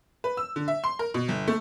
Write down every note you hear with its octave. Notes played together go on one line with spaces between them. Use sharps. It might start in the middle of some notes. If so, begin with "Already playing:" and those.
B4
E6
D3
E5
C6
A#4
B2
G1
A3